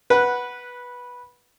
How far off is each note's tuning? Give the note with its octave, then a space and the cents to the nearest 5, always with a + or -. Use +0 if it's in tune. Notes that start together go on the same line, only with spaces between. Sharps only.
B4 -10 F#5 +0